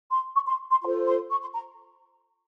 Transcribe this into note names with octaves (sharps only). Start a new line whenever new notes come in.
C6
C#6
C6
C6
F4 A4 C5 C6
C6
C#6
C6
A#5